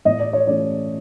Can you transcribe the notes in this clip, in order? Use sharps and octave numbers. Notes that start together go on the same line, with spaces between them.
A2 D#5
D5
C#5
E3 A3 C#4 D5